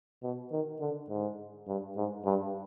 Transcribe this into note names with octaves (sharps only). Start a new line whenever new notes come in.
B2
D#3
D3
G#2
G2
G#2
G2